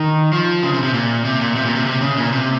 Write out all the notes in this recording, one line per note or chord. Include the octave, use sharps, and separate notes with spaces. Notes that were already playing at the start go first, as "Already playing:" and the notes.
Already playing: D#3
F3
C#3
C3
C3
A#2
C3
A#2
C3
A#2
C3
C3
C#3
A#2
C3